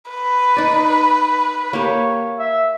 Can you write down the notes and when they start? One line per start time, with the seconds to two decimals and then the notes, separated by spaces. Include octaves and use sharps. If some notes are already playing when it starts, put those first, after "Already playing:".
0.11 B4
0.57 D#4 D5
1.73 A#3 G4 C#5
2.39 E5